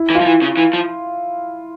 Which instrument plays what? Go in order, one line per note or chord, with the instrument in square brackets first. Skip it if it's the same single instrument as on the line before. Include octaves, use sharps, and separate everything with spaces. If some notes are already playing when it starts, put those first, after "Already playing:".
Already playing: [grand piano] E4
[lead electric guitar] E3
[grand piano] F4
[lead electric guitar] F3
E3
C#3
E3
F3